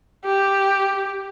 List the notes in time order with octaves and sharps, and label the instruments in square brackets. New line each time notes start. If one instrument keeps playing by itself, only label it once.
[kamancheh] G4